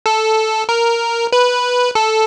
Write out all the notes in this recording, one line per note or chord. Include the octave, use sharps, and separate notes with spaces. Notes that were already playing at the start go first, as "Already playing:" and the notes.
A4
A#4
B4
A4